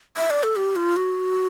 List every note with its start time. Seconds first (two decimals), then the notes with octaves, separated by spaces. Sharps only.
0.17 E5
0.30 D5
0.43 A4
0.56 G4
0.76 F4
0.96 F#4